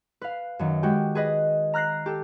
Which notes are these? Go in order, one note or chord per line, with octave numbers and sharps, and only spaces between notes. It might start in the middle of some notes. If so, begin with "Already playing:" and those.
B4 F5
F#2 D#3
G#3 F#4 G4 G5
G#4 B4 D#5
A#5 F6 F#6 A#6 C7
G4 A4